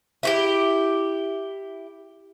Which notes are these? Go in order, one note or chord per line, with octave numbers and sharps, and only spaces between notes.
E4 F#4 G4